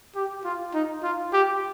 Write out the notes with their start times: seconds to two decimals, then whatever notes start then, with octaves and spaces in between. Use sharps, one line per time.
0.16 G4
0.45 F4
0.74 D#4
1.03 F4
1.33 G4